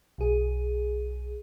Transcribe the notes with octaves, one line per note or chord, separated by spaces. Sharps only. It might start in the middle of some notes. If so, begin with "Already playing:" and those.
B1 G#4